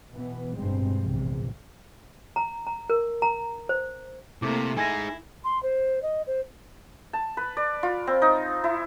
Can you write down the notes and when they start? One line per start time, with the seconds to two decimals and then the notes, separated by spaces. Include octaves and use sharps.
0.12 B2 E3 B3
0.57 G1 G2 B2 G#3 C4
1.00 A#1 E2 G#2 C3
2.36 A#5
2.67 A#5
2.90 A#4
3.22 A#5
3.69 C5
4.42 C3 A3 A#3 E4 D6
4.77 D#4 E4 G#4 G#5 G#6 A#6
5.44 C6
5.63 C5
6.02 D#5
6.27 C5
7.13 A5
7.37 B4
7.57 D5
7.83 F4
8.07 C4
8.22 D#4
8.64 E4